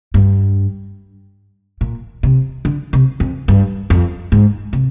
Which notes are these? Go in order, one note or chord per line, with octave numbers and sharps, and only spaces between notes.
G2
A#2
C3
D3
C3
F2
G2
F2
G#2
C3